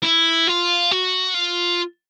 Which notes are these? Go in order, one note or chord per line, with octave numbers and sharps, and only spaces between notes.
E4
F4
F#4
F4